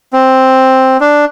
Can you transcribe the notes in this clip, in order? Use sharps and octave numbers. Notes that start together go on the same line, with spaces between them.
C4
D4